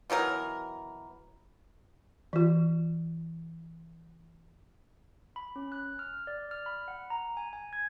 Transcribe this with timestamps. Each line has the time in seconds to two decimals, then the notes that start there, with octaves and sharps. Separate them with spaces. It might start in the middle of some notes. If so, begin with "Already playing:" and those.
0.10 B2 E3 F#3 A#4
2.33 E3 F4
5.36 B5
5.56 C#4
5.72 F#6
5.99 F6
6.27 D5
6.51 F6
6.66 B5
6.88 F#5
7.10 A#5
7.37 G#5
7.53 G#5
7.73 G#6